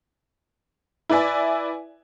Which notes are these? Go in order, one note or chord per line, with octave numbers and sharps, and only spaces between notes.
E4 B4 D5 E5 G#5